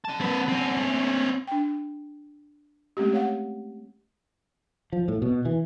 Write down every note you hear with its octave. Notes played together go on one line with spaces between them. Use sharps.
F#5 A5
C4 B4
C4 C#4
A3
D4 G5
G#3 A3 C4 C#4 G4
C#5 F5 F#5
F3
A2
B2
E3